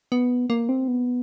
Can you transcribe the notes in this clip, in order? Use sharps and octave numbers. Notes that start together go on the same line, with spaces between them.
B3
A#3
C4
B3